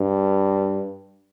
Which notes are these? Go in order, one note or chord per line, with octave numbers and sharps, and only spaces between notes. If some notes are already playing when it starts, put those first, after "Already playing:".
Already playing: G2